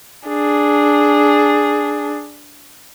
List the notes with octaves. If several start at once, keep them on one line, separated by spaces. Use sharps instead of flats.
D4 G#4